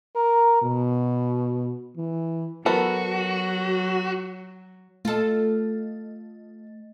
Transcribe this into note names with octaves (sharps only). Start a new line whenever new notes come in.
A#4
B2
E3
F#3 B3 F#4 A4 A#4
A3 F4 A4 D#5